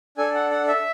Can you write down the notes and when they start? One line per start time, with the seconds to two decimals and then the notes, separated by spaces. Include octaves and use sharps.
0.17 D4 A4 G#5
0.34 F#5
0.51 F#5
0.68 E5